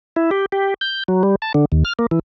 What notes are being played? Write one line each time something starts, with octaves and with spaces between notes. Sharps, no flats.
E4
G4
G4
G6
F#3
G3
A5
D3
D#2
F6
A#3
E3